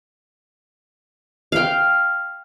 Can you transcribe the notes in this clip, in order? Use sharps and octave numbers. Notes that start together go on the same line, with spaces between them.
F5 G5